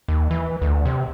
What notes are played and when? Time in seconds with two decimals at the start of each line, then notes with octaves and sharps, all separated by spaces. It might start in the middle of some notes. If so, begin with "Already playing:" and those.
0.08 D#2
0.31 E3
0.62 D2
0.86 C3